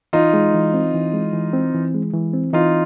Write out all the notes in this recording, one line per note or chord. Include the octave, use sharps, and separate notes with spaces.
E3 D#4 F4
G#3
E3
C4
E3
G#3
E3
C4
E3
G#3
E3
C4
E3 D#4 F4